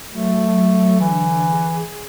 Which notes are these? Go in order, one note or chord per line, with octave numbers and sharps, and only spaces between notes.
F#3 A3 A4
D3 E3
G#4